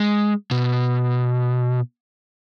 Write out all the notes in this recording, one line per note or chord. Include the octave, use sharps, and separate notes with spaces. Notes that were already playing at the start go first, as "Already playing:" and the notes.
Already playing: G#3
B2